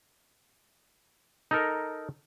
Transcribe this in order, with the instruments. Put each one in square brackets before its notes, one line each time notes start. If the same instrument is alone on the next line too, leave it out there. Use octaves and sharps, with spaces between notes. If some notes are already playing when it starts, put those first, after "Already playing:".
[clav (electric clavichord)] D#4 A4 A#4